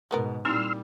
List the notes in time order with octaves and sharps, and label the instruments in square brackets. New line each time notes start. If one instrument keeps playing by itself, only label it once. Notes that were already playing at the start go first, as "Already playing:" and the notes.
[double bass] G#2 B2 [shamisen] G#3 B3 A#4
[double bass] A#2 G3 [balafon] C4 D#4 E4 [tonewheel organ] C6 E6 F6